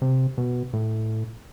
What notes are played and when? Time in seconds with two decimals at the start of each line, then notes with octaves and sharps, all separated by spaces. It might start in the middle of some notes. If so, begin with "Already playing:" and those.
0.02 C3
0.38 B2
0.73 A2